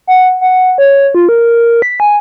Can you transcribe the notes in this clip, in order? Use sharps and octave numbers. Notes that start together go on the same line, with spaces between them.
F#5
F#5
C#5
F4
A#4
B6
G#5